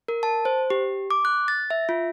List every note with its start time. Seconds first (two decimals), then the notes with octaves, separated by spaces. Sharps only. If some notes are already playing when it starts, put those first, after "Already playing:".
0.08 A#4
0.23 A5
0.45 C5
0.70 G4
1.10 D6
1.25 F#6
1.48 A6
1.70 E5
1.89 F4